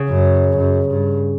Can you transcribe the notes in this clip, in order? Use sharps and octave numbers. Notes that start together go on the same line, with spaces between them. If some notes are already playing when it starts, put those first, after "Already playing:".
Already playing: C#3
F#2
F#2
G2